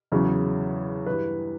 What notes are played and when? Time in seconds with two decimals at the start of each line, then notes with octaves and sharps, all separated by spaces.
0.12 E2 C#3 F#3
1.06 G2 E3 G3 B4